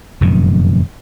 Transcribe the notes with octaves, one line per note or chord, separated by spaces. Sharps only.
F1 F#2 A#2 D#3